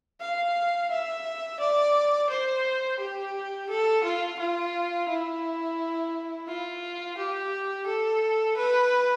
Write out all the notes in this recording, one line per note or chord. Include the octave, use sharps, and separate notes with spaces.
F5
E5
D5
C5
G4
A4
F4
F4
E4
F4
G4
A4
B4